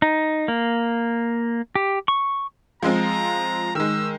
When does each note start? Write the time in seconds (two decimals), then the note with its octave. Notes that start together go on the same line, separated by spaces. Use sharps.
0.02 D#4
0.48 A#3
1.75 G4
2.08 C#6
2.83 F3 G#3 C4 A#5
3.75 D#3 G#3 E6